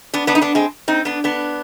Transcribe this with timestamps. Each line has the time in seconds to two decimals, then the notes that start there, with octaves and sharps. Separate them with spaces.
0.14 B3 D4
0.27 B3 D4
0.35 D#4
0.42 B3 D4
0.55 G#3 C4
0.88 C4 D#4
1.05 B3 D4
1.24 B3 D4